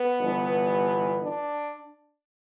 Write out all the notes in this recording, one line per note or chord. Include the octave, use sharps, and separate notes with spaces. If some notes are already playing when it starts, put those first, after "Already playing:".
Already playing: B3
G1 G2 E3
D4